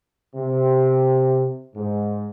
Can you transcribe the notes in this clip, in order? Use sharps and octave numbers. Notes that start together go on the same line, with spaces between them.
C3
G#2